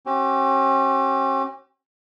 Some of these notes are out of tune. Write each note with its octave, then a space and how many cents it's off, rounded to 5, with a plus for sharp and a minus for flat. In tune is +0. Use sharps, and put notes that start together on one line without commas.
C#4 -45 G4 -45